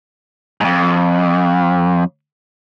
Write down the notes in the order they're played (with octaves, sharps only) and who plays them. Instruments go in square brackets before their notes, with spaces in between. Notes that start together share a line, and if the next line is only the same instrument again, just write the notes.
[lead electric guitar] F2 G#2